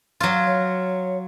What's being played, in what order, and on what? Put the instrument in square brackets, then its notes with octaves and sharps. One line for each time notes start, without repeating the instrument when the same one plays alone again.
[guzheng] F#3 F4
[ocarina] C#5